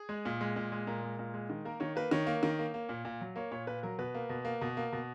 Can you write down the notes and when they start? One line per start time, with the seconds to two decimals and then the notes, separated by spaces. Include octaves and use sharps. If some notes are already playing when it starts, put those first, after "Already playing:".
Already playing: G#4
0.09 G#3
0.25 A#2
0.41 G#3
0.56 A#2
0.72 G#3
0.87 A#2 A#4
1.03 G#3
1.19 A#2
1.34 G#3
1.50 D#3
1.65 A#3 A#4
1.80 D#3 C#5
1.96 A#3 B4
2.11 D#3 C#5
2.27 A#3
2.43 D#3
2.59 A#3
2.74 A#3
2.89 A#2
3.05 A#2
3.21 F#3
3.36 A#3 C#5
3.51 A#2 C#5
3.67 A#2 B4
3.83 F#3 A#4
3.99 B2 B4
4.15 A#3
4.29 B2
4.45 A#3
4.61 B2
4.77 A#3
4.93 B2